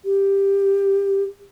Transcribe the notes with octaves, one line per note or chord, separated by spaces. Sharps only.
G4